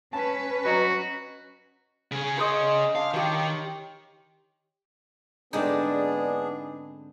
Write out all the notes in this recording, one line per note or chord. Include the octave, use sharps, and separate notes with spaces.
C#4 B4 A5
F#3 F#4 D#5 A#5
C#3 G#4
C5 D5 D#5
D4 F5
D#3 G4 C#5
G#2 D3 B3 C4 D4 D#4 G#4 D5